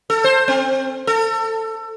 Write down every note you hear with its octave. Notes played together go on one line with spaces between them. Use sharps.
A4
C5
C4
A4